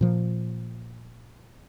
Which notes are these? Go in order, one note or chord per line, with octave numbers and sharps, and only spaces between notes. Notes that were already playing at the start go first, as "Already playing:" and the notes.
A#2 F3